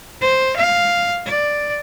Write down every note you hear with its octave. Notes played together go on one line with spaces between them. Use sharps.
C5
F5
D5